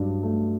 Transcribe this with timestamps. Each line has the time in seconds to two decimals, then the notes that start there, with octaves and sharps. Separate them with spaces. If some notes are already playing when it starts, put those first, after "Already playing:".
Already playing: G2 F#3 D4
0.23 A3